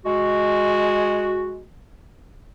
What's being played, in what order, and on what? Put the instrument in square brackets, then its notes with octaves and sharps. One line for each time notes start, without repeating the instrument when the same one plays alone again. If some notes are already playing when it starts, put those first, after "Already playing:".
[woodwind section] G#3 F#4